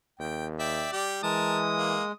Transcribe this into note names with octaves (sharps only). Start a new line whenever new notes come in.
D#2 G5
D5 E5 G5
G3 G4
E3 G#3 A#4 A5 D#6
A#3